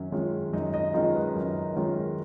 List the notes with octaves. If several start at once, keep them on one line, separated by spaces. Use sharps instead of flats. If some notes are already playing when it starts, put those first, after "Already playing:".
Already playing: F#2 D#3 C#4
D#3 G#3 C#4 F4
F#2 D#4 D#5
D#4 D#5
D#3 G#3 C#4 D#4 F4 D#5
B4
F#2 A#4
D#3 G#3 C#4 F4 A#4